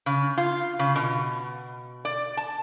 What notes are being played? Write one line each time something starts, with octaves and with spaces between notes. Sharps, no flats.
C#3
F4
C#3
B2
D5
A5